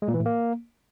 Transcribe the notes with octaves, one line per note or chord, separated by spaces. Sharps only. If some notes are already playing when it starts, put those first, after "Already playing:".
G#3
A#2
E3
A2
A#3